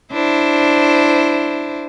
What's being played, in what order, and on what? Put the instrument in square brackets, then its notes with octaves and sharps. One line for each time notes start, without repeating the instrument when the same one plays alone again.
[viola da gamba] D4 E4 C5